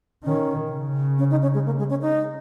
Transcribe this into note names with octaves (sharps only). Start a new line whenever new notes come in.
D#3 C#4
C#3
C#4
D#4
C#4
G#3
A#3
G#3
C#4
D#4